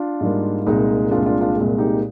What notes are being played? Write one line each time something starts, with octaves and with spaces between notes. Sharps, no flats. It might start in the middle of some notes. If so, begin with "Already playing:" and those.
Already playing: D4 F4
G#2 G3 A#3
C2 A#2 G#3 D#4
C2 A#2 G#3 D4 F4
D4 F4
D4 F4
C2 A#2 G#3
D#4 G4